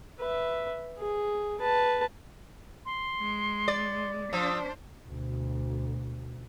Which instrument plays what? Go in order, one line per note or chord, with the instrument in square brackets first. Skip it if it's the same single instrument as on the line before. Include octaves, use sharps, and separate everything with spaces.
[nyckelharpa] B4 E5
G#4
B4 A5
[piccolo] C6
[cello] G#3
[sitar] D5
[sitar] F3 [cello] D4 C5 [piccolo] E6
[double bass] D2 B2